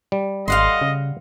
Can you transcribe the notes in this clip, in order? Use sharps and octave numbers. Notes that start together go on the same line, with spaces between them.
G3
G#1 D#5 F5 F#5 C6
C#3